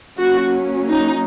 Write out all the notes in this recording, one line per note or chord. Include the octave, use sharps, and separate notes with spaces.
F#3 A#3 C#4 F#4
D#4